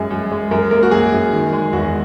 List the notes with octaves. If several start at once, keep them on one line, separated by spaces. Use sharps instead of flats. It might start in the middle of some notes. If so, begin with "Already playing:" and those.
Already playing: F#2 G#3 G#4
F#2
G#3
F#2 A#4
A#3 A#4
F#4
F#2 G#4
F#2
D#3
G#3
E2 F#4